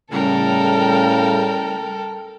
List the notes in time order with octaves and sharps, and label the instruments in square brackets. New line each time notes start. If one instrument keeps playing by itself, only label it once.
[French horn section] A2 C#3 [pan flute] G3 [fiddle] A4 [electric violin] A#4 G5